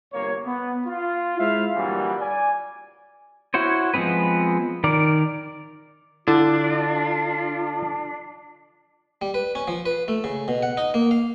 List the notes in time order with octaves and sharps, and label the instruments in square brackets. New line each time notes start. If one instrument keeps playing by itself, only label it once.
[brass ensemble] G1 C2 A#3 C#5
B3
F4
G#3 E4 C5 E5 F5
G2 A#2 D3 E3 F#3 G3
D5 G#5
[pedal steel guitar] E4 F#4 C5 C#5
F3 G#3 B3 C4 B4
D#3 A#4 D5
[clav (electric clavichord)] D3 [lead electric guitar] D4 [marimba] E4 [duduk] F4
[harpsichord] G3
B4
C#4
F3
B4
A3
C#3
B2
F#5
D#4
A#3
F5